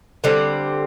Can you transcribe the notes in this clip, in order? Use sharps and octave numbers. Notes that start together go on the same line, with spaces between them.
D3 G3 C4